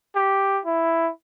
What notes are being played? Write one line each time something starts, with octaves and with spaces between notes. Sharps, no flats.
G4
E4